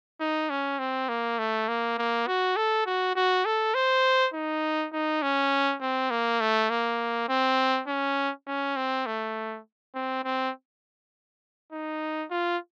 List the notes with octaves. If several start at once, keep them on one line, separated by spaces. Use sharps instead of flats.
D#4
C#4
C4
A#3
A3
A#3
A#3
F#4
A4
F#4
F#4
A4
C5
D#4
D#4
C#4
C4
A#3
A3
A#3
C4
C#4
C#4
C4
A3
C4
C4
D#4
F4